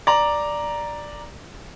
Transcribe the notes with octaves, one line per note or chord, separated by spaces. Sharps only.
D5 A#5